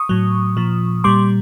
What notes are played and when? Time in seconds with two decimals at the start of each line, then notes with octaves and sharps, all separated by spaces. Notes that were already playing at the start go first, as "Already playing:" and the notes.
Already playing: C#6 D#6
0.09 A2 F#3
0.57 A#2 F3
1.04 A#2 G3 C6 D6